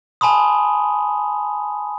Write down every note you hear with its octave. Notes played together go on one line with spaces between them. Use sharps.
G#5 A5 B5 C6 D#6